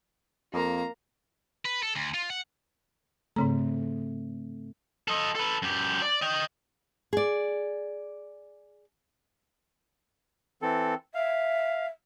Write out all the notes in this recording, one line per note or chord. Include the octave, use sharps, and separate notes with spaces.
F2 A#3 A#5
B4
A4
D2
F4
F#5
G#2 C#3 A3 C4 A#5
A4 D#5
A4 B4
F#2 G4
D5
D#5 G5
G#4 D5
E3 C4 A4
E5 F5